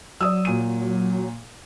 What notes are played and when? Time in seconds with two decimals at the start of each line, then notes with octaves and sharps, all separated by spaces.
0.21 F#3 D5 D#6 E6
0.45 A#2 D#7